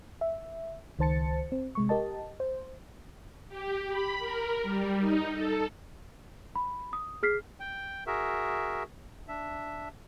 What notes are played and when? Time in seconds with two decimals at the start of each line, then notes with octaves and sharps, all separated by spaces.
0.21 E5
0.99 C#2 D#3 C5 A5 A6 C#7
1.52 C4
1.75 C3 G#3 C#6
1.89 G4 A#4 D#5 A5
2.40 C5
3.49 G4
3.89 B5
4.19 A#4
4.63 G3
5.00 D#4
5.32 A4
6.56 B5
6.93 D#6
7.23 G#4 F6 B6 C7
7.60 G5
8.07 F#4 G#4 A#4 E5
9.28 D4 E5